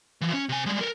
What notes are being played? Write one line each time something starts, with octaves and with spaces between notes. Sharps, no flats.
E3 F3
C#4
C3 G#5
G3 G#3
A4 A#4